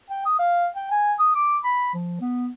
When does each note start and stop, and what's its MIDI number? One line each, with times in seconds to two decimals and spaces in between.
0.10 0.21 79
0.26 0.36 87
0.39 0.67 77
0.76 0.88 79
0.91 1.13 80
1.19 1.33 87
1.35 1.57 86
1.64 1.92 83
1.94 2.19 53
2.21 2.48 59